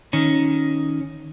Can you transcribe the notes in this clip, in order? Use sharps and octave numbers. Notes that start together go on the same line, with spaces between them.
D#3 C#4